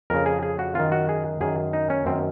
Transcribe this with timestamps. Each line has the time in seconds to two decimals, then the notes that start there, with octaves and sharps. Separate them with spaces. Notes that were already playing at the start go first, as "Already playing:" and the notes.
0.10 F2 C#3 A#4
0.26 G#4
0.43 G#4
0.59 F#4
0.75 F#2 D#3 F4
0.92 F#4
1.09 G#4
1.41 F#2 D#3 G#4
1.73 D#4
1.90 C#4
2.06 F#2 D#3 C4